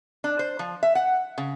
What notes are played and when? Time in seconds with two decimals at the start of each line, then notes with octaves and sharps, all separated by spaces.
0.24 D4
0.39 C5
0.59 F3
0.83 E5
0.95 F#5
1.38 C#3